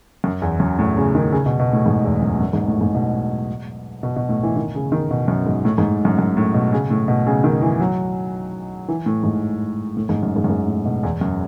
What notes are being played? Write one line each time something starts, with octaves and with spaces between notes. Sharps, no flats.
F#2
E2
F#2
A2
C#3
D#3
C#3
B2
B2
A2
G#2
E2
F#2
F#2
G#2
A2
G#2
B2
B2
B2
A2
E3
D#3
C#3
D#3
B2
F#2
G#2
A2
G#2
F#2
F#2
A2
B2
C#3
A2
B2
C#3
D#3
E3
F#3
E3
A2
G#2
A2
G#2
F#2
G#2
F#2
G#2
A2
B2
E2
F#2